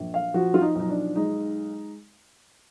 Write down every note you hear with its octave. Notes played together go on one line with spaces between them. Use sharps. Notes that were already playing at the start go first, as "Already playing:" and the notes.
Already playing: A#1
F5
F3 F#4
F4
D#4
B1 D#4
D4
G#3 D#4